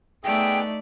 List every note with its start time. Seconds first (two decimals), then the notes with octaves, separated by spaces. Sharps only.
0.24 A3 B3 D#4 G#4 D5 E5 G5